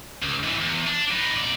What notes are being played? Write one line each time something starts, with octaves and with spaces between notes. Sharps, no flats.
C#2
G#2 E3
E2
D4
D#4 B4
B2 D5